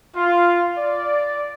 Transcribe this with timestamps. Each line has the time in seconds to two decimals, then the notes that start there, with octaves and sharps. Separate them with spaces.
0.16 F4
0.78 D5